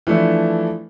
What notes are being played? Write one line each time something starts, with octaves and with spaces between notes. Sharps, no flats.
E3 F3 A3 D4 E4